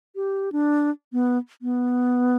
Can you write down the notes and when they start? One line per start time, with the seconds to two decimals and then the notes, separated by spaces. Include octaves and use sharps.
0.16 G4
0.52 D4
1.13 B3
1.62 B3